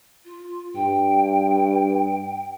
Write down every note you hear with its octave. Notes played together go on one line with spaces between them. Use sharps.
F4
G2 G5